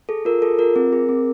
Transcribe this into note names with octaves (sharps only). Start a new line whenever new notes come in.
G#4 A4
F4 A#4
G#4 A4
F4 A#4
C4
G#4
C4